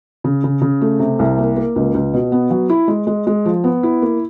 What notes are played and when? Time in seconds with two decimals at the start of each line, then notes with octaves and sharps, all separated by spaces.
0.24 C#3
0.44 C#3
0.62 C#3
0.81 A3
0.99 C3
1.19 C2
1.38 A#3
1.57 A#3
1.76 C#2
1.94 C#2
2.14 B2
2.32 B3
2.50 F#3
2.70 E4
2.88 G#3
3.07 G#3
3.27 G#3
3.45 F3
3.64 B3
3.83 E4
4.02 A#3